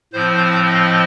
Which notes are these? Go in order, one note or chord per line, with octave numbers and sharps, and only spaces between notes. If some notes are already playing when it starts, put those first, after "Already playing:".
A2 F3 C4 C5
D#5